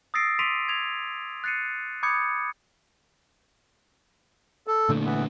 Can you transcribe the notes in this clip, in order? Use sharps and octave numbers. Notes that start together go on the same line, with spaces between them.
D#6 E6 A6 A#6 C7 D7
C6 D6 B6 D7 D#7 F7
G#6 F7
F#6 A6 C7 C#7 D#7
B5 D6 D#6 G6 G#6 C#7
A4
A#2 D3 A3
E3 B3